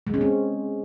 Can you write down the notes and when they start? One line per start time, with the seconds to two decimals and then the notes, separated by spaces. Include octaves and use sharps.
0.07 G#3
0.14 C#4
0.21 C4